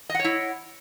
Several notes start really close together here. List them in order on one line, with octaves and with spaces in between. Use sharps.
D#5 F#5 C#5 E4